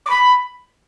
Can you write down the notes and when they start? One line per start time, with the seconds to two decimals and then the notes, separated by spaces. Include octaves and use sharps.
0.06 D6
0.10 B5